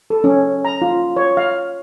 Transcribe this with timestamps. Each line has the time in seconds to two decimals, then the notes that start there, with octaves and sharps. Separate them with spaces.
0.10 A4
0.24 C#4
0.65 A#5
0.82 F4
1.17 C#5
1.37 F5